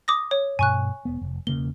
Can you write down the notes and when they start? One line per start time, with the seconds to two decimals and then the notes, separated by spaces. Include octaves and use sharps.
0.08 D6 D#6 A#6
0.31 C#5
0.59 G2 B2 G#5 C#6 F#6
1.05 E1 B3
1.21 F1
1.47 E1 C#3 A#3 G7